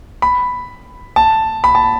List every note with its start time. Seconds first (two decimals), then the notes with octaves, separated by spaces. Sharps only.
0.22 B5
1.16 A5
1.64 B5
1.75 A5